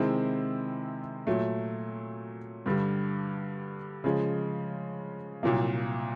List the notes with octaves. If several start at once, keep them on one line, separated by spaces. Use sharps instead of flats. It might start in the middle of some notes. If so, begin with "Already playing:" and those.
Already playing: C3 D#3 G#3 C4 E4
A#2 F#3 A3
G2 D3 G3
C#3 F3 G#3
C2 A#2 F#3 A#3